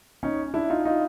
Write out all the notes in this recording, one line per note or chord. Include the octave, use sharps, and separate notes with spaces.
C#4 D#4
D4 E4
D#4 F4
D#4 F4